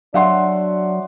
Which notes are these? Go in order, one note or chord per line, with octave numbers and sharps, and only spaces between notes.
F#3 D4 E5 F#5 C6